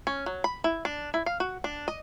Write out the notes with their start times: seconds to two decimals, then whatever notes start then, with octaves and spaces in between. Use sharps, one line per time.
0.07 C#4
0.26 F#3
0.44 B5
0.64 E4
0.85 D4
1.14 E4
1.26 F5
1.40 F#4
1.64 D4
1.88 D#5